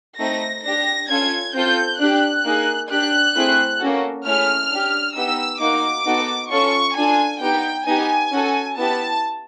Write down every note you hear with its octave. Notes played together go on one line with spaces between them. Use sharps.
A3 C4 D#4 A#6
D4 G4 A#6
C#4 F4 A4 G#6
C4 F4 A4 G6
D4 G4 F#6
A#3 D#4 G#4
D4 G4 F#6
A3 C4 E4 G#4
A#3 C#4 F#4 A4
A3 C#4 E4 G#4 F6
D4 G4
B3 D#4 G4 E6
A#3 D#4 F#4 D6
B3 D#4 F#4 A4
C#4 F4 A4 C#6
D4 F4 A4 G#5
B3 D#4 G4 G5
B3 D#4 G4 G#5
C#4 F#4 A4
B3 E4 G4 A5